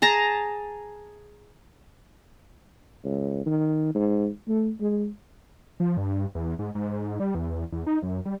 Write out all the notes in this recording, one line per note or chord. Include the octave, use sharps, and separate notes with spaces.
G#4 A5 A#5
C#2
D#3
G#2
A3
G#3
F3
G2
E2
G#2
G#2
G3
E2
E2
D#4
F#2
G3